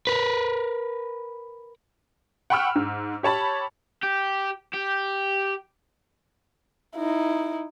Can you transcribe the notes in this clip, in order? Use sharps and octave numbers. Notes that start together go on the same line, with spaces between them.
A#4 B4
F#5 G5 B5 C#6 E6 F6
G#2
G4 C#5 A5 B5
G4
G4
D#4 E4